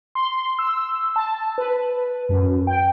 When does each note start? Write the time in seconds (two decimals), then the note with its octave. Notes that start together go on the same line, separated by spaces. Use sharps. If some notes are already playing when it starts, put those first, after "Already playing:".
0.15 C6
0.59 E6
1.16 A5
1.58 B4
2.29 F#2
2.67 G5